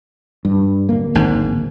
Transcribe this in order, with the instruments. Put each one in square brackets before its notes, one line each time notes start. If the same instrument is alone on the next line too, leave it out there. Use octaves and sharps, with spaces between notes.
[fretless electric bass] G2
D1 A#3
[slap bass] G#1 G#2